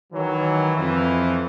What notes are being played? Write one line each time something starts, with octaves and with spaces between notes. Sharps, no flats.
D#3 E3 F#3
F2 E3